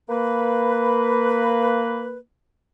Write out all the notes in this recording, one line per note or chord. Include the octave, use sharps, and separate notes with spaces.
A#3 B4